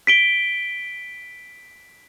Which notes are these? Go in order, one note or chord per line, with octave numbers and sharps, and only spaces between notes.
B6 D7 G7